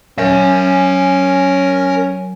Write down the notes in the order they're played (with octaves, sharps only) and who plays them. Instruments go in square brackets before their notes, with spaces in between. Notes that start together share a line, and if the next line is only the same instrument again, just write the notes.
[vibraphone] F#3 G#5 [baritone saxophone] C#4 [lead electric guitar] A#4 E5